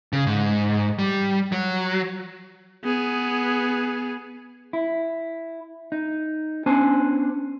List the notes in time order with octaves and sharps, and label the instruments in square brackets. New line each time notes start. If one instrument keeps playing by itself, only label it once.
[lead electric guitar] C#3
G#2
G3
F#3
[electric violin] B3 G#4
[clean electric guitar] E4
D#4
B3 C#4 D4 C5 G#5 A5